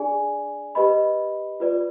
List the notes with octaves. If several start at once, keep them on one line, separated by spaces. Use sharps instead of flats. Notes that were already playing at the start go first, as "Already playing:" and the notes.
Already playing: D4 G#4 D5 G#5
G4 B4 D#5 B5
F4 B4 D5